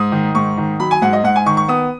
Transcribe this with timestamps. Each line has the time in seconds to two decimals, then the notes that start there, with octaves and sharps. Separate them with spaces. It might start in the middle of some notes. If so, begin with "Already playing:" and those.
Already playing: G#2 D#6
0.12 D#3
0.35 G#2 C#6
0.57 D#3
0.79 F#3 B5
0.91 G#5
1.02 G#2 F#5
1.13 D#5
1.23 G#2 F#5
1.36 G#5
1.46 D#3 C#6
1.57 C#6
1.68 B3 D#6